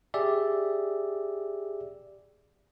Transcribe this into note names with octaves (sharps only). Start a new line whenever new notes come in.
G4 G#4 D5 E5